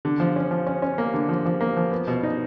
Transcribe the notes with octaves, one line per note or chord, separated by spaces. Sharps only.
D3
F3
C#4
F3
C#4
C#4
A#3
D3
F3
F3
A#3
F3
B3
B2
D#4